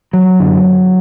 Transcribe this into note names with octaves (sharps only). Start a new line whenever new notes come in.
F#3
F#2 D3